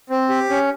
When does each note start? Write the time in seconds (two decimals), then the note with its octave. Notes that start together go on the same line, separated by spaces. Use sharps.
0.10 C4
0.29 G4
0.50 C#4